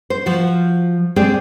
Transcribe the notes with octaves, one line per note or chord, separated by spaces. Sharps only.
C5
F3 F#4
G#3 C4 G4 G#4 C5 D5